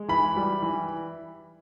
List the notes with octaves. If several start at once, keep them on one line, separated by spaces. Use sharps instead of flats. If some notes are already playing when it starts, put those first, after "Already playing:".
Already playing: G#3
E3 B5
G3
E3